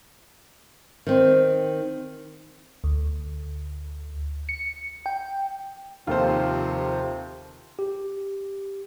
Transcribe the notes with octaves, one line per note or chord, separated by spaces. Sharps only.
D#3 C4
D2
C#7
G5
D#2 C3 F3 F4 A4 C5
G4